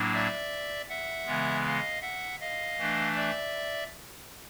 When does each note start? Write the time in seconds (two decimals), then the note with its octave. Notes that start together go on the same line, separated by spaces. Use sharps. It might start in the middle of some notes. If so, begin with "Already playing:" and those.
Already playing: A2 F#3 A#3 D4
0.14 D5 E5
0.89 E5 F#5
1.26 C#3 E3 G#3 B3
1.64 D#5 F5
2.02 E5 F#5
2.40 D#5 F5
2.78 E3 A3 D4
3.16 D5 E5